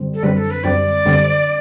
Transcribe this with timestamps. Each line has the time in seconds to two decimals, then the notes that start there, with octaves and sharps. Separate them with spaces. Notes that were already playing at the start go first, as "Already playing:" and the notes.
Already playing: F#2 D3 G3 C4
0.14 A4
0.22 F#2 D3 G3 C4 B4
0.37 A4
0.50 B4
0.64 F#2 D3 G3 C4 D5
1.06 F#2 D3 G3 C4